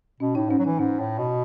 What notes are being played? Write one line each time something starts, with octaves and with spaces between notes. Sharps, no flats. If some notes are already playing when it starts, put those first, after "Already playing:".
B2 C#4
A2 D#4
G#2 C#4
F#3
E3 D#4
G#2 C#4
A2
B2